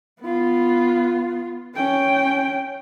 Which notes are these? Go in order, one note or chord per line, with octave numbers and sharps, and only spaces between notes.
B3 F4
C#4 G5